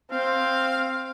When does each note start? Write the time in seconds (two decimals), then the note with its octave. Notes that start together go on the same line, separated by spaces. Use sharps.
0.11 C4 F5